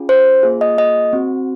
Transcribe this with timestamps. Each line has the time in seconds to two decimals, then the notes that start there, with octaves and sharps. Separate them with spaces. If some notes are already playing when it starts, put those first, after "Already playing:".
Already playing: C#4 F4 G#4
0.09 C5
0.43 A#3 F4 G#4
0.61 D#5
0.78 D#5
1.13 C4 F#4